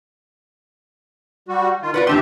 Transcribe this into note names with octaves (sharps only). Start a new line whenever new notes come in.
G3 F#4
D#3 F4
F4 B4 D5 F#5
D#2 D4 G4 E5 C6